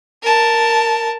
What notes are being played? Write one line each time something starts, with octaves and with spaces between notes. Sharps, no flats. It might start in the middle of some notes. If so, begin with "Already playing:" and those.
A#4 A5